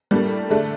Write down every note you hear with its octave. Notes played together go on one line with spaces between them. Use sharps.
A2 G3 A#3 D4
D3 A3 D4